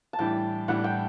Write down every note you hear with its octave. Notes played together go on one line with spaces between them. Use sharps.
A5
A2 E3 G3 D4 G5
A2 E3 G3 D4 F#5
G5